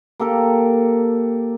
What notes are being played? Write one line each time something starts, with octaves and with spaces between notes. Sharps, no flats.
A#3 G4 A4 A#4